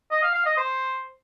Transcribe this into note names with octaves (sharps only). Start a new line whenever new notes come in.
D#5
F5
F5
D#5
C5